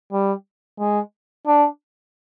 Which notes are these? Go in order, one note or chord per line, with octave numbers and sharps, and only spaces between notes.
G3
G#3
D4